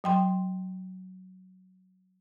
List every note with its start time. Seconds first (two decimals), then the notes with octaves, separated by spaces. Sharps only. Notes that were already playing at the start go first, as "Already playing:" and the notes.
0.04 F#3 G5 C6